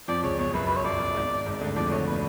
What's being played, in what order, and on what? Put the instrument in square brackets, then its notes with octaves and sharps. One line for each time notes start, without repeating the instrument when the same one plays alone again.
[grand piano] F2 F3 [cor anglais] D5
[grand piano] C#2 C#3 [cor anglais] C#5
[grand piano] B1 B2 [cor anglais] C#5
[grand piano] F#2 [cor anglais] B4
[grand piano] F#2 [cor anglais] B4
[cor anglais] C#5
[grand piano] F#2 [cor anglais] D5
[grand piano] F#2
G#1 G#2
G#1 G#2
D2 D3
[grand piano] F2 F3 [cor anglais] D5
[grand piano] D2 D3 [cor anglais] C#5
[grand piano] B2 [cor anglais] B4